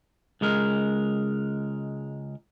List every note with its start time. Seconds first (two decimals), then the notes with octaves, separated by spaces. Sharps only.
0.41 C#2 G#3 A#4